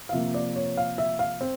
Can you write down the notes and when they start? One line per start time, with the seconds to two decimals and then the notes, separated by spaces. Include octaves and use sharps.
0.09 F5
0.12 C3 F3 A#3 E5
0.34 D5
0.56 C#5
0.77 F5
0.98 E5
1.19 F5
1.41 C4